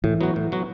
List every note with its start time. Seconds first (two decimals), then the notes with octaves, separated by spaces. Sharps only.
0.04 A2 E3
0.21 F#3 B3 F#4
0.36 A2
0.52 F#3 B3 F#4